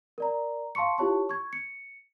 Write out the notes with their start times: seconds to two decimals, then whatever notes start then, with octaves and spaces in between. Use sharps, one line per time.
0.18 A#4 D5 A#5
0.75 F5 A5 C6 C#6 C#7
0.98 E4 F4 G4 C#5 A5 C#6
1.29 C#6 G#6
1.53 C#7